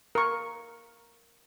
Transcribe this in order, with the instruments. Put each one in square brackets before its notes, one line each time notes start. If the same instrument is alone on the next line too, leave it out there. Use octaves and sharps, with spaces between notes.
[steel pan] A#4 C#6